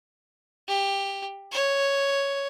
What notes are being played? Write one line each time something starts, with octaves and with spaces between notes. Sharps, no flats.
G4
C#5